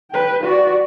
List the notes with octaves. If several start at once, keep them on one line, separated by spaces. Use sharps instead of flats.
B4 G5
F#4 D5